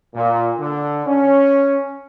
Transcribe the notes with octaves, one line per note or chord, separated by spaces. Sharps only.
A#2
D3
C#4